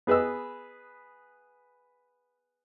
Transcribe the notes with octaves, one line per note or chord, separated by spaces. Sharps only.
B3 G#4 B4 D#5 E6